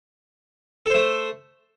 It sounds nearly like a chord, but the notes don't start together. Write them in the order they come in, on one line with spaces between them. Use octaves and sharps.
A4 C5 A3